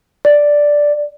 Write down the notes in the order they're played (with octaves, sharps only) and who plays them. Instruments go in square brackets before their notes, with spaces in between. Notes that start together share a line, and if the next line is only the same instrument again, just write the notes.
[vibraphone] D5